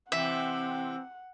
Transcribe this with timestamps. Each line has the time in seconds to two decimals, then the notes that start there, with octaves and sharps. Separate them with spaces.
0.12 C3 E3 C4 E5 F#5